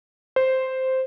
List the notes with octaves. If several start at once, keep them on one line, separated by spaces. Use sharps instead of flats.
C5